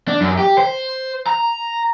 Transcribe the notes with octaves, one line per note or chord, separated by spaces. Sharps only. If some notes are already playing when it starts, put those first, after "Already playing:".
D4
F#2
G4
C5
A#5